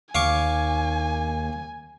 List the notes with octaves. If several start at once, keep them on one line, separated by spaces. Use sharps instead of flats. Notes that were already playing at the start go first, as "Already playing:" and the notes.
D#2 F5 G#5 C#6 D6